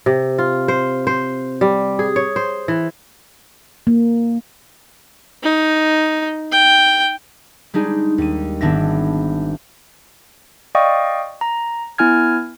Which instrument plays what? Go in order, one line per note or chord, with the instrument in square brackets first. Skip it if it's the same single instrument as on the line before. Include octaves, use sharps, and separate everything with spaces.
[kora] C3
F4
C5
C5
G3
G#4
C#5
C5
E3
[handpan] A#3
[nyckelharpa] D#4
G5
[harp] G3 G#3 D4 D#4 G#4
D#2 D#7
G#1 B3 D4 E5 A#6
[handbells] D5 D#5 F5 G5 C#6 D#6
A#5
B3 E4 G#5 F6 G#6